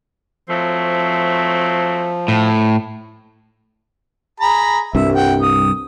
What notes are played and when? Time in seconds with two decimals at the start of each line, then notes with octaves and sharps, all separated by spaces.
0.49 F3 F#3 A3 C4
2.28 A2
4.40 G#4 A#5 B5
4.95 C2 G2 E5
5.15 F#5 G5
5.42 D#6